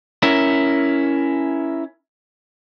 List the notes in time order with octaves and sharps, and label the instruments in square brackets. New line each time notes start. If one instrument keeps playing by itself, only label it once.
[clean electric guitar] C#4 E4 A#4